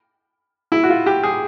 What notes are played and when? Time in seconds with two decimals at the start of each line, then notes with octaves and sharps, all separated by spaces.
0.72 E4
0.83 F#4
0.90 F4
1.06 G4
1.23 G#4